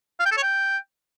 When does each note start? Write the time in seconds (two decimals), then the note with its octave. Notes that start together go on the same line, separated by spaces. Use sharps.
0.20 F5
0.25 G5
0.31 A4
0.37 C#5
0.43 G5